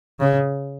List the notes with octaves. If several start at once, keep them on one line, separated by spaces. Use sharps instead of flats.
C#3